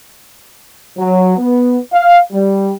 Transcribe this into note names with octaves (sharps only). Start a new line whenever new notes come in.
F#3
B3
F5
G3